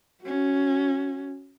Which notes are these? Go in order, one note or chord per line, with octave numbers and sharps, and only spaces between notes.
C#4 F#4